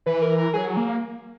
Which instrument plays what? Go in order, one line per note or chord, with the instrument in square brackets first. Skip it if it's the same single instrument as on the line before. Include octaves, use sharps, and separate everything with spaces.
[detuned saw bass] E3 [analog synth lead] B4
[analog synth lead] A#4
A#4
[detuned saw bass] F#3 [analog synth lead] G#4
[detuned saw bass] A#3